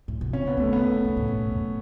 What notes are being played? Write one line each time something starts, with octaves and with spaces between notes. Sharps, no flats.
A2
B2
C#3 C#4
B3
D3 A3
B3
D3
C#3
A2
B2
F#2